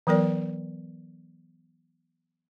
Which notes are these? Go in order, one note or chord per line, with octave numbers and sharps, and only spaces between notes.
E3 F#3 B3 A#4 D5